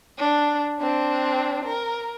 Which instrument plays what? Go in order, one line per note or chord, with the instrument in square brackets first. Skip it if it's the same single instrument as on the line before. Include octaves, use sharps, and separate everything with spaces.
[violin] D4
C4 D4
A#4